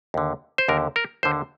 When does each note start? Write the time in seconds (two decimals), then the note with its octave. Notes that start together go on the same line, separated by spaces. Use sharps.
0.14 D#2 D3
0.58 C5
0.68 D#2 D3 A#4
0.96 A#4
1.23 D#2 D3 C5